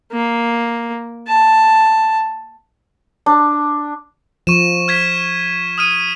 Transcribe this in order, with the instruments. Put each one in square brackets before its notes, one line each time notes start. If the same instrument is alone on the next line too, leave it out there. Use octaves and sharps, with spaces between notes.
[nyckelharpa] A#3
A5
[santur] D4
[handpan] F3 [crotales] C#6 D#7 E7
[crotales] F6 G#6 B6
D#6 F6 D#7